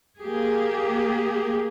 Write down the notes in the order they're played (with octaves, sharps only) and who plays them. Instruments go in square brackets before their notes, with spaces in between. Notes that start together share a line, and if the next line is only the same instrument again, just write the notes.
[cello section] A#3 G4 G#4